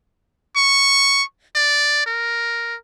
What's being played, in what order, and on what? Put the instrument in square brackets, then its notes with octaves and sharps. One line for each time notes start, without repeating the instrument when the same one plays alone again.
[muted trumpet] C#6
D5
A#4